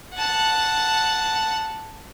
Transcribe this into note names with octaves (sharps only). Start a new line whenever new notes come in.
F#5 A5